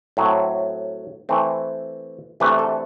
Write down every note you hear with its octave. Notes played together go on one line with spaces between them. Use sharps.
A2 F#3 C4
E3 A3 C4
C3 E3 A3 D4 B4
A4